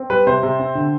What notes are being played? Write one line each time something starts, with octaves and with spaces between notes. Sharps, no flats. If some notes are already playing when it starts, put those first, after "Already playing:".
Already playing: C4
G3 B4
C3 C5
C3
C4
D3